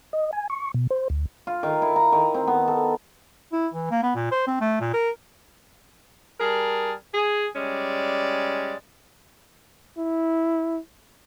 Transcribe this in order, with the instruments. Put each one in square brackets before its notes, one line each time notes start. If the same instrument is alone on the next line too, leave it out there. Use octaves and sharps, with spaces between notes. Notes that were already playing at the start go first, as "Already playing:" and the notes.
[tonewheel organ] D#5
G#5
C#6
B2
C5
D2
[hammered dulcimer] F4
D#3
E4
A#5
D#3
C4
B3
A4
[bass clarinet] E4
E3
A#3
B3
A#2
C5
C4
A3
A#2
A#4
[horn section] G3 G#4 A#4 A5
G#4
G3 G#3 C#4 D5
[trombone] E4